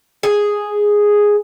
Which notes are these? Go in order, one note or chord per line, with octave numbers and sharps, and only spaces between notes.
G#4